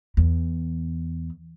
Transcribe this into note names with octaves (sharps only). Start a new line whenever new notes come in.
E2